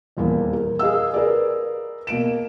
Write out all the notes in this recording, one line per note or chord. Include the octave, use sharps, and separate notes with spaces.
D#1 E2 A#3 E4
A#4
G#4 A#4 D#5 F5 E6
G#4 A#4 B4 D5
B2 A#3 D7 E7